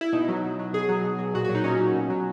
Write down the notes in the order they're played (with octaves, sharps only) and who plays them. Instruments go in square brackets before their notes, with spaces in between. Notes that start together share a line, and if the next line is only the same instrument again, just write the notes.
[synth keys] E4
B2 D#4
F#3
B2
F#3
B2 G#4
F#3
B2
F#3
A#2 F#4
F#4
F#3
D#4
A#2 C#4
F#3
B2
F#3